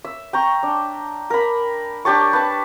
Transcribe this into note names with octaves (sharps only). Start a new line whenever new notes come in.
E5
G5 A#5 C#6
D4
A#4 B5
D4 G4 A5 C#6
B4 A5